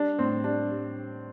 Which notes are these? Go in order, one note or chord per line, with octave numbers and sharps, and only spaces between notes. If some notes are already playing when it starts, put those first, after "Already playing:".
Already playing: G3 D4
A2 C4
G3 D4
G3